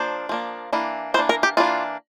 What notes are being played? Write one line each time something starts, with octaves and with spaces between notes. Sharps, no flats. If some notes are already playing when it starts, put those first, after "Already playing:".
Already playing: F3 A#3 D4 C5
F3 A#3 D4
E3 A#3 D4
E3 A#3 D4 C5
A#4
G4
E3 A#3 D4 F4